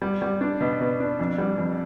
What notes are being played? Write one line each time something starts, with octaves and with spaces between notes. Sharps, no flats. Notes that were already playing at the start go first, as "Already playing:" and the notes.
G3
G3
D4
B2
B2
D4
F2
G3
F2